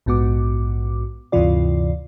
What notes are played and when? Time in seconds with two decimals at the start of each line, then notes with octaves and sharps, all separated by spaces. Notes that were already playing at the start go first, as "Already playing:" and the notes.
0.06 A#1 G#2 B3 F#4 D6
1.32 D2 G2 C3 E3 F4 D5